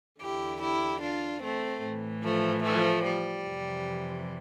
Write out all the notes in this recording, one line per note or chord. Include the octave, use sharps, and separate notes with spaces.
E2 D3 E4 G4
E4 G4
D4 F4
A3 C4
A2
E3
F3 A3
F3 A3
G3
F2 C3 E3